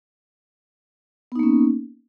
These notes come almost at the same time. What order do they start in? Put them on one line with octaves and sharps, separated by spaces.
B3 D#4 A#3 C#4